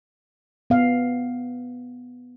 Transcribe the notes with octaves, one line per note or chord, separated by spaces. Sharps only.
B3 F5